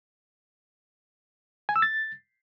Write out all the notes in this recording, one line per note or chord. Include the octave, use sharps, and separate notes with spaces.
G#5
E6
A6